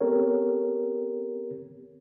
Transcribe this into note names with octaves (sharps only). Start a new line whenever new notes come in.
B3 C4 G4 A4 A#4 C#5